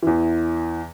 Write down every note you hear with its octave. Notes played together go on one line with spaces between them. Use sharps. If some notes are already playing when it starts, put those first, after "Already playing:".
E2 E3